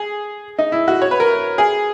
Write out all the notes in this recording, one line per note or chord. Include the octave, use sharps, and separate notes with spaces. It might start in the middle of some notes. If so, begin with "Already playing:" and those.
Already playing: G#4
D#4
E4
F#4
C#5
B4
A#4
G#4